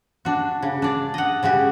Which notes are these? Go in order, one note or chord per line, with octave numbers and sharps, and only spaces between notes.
D4 F#4
C#3
D4 D5
D#5 F#5
C#3 G#3 F#4 G4